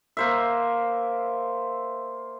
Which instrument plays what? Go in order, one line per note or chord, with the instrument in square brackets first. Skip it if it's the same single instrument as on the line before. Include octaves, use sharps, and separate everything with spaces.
[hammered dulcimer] A#3 C5 E5